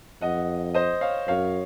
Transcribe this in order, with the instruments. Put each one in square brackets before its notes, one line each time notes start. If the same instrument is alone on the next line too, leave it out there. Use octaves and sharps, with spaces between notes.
[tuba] F2 [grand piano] D#5 F#5
[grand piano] C5 D#5
C#5 F5
[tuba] F#2 [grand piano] C#5 F5